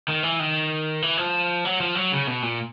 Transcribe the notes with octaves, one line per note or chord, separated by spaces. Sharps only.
D#3
E3
D#3
E3
F3
F#3
F3
F#3
C#3
B2
A#2